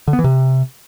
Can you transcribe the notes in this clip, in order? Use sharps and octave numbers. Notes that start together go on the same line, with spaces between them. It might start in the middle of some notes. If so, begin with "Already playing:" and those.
D3
B3
E3
C3